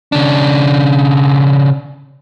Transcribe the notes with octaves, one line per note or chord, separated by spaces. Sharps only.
C#3 D4